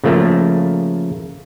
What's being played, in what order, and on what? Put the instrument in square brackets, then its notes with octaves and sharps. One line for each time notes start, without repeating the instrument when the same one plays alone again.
[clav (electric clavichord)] C#3 F3 A3 A#3